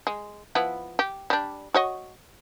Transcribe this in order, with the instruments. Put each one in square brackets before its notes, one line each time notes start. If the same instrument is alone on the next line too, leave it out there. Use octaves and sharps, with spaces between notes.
[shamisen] G#3
F3 B3 E4
G4
G3 D4
F#4 C#5 D#5